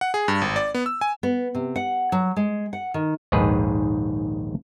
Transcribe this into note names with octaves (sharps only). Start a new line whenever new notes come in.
F#5
G#4
G2
G#1
D5
B3
E6
G#5
B3
C3
F#5
F#3
G#3
F#5
D#3
A#1 D#2 G#2 D#3 G#4 B4